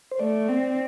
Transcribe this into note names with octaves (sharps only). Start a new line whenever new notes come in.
C5
A3 D5
C4